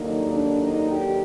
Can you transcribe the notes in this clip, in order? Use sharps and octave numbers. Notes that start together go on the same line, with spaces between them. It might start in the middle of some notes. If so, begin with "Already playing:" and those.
Already playing: D#2 D3 F#3 A#3 D#4
D4
D#4
G4